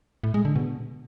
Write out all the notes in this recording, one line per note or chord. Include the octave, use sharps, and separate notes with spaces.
A2
G#3
D3
B2